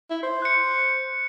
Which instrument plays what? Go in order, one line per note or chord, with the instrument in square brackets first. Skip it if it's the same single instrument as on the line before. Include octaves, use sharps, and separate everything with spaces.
[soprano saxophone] E4
C5
[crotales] F#6 C#7